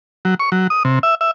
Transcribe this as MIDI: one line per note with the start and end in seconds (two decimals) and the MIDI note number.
0.25 0.35 54
0.40 0.50 85
0.52 0.67 54
0.70 0.83 87
0.85 0.99 48
1.03 1.15 76
1.21 1.31 76